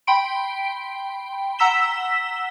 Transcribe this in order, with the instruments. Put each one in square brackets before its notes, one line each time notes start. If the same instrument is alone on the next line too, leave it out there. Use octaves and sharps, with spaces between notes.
[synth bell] G5 B5 C6 D7
F#5 A#5 E6 B6 E7 G7